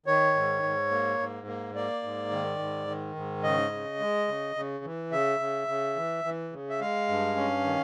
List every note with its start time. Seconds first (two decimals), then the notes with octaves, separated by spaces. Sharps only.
0.06 D#3 C#5
0.35 G#2
0.63 G#2
0.91 A#3
1.19 G#2
1.47 A#3
1.75 A#3 D5
2.03 G#2
2.31 D#3
2.59 G#2
2.88 D#3
3.15 G#2
3.43 C#3 D#5
3.72 C#3
4.00 G#3
4.28 C#3
4.56 C#3
4.84 E3
5.11 C#3 E5
5.40 C#3
5.68 C#3
5.96 E3
6.24 E3
6.52 C#3
6.69 E5
6.80 G#3 F5
7.08 G2
7.36 C#4
7.64 D#3